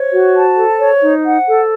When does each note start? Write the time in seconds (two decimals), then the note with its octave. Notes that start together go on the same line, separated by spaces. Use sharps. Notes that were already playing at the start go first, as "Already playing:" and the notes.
Already playing: C5 C#5
0.12 F#4
0.35 A5
0.57 A4
0.79 C#5
1.01 D#4
1.24 F#5
1.46 A4